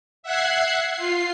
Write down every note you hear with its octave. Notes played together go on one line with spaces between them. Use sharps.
E5 F#5 F#6 G#6 C7
F4 C7